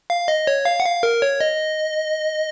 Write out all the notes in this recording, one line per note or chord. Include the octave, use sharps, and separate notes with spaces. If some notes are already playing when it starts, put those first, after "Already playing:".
F5
D#5
C#5
F5
F#5
F5
A#4
C#5
D#5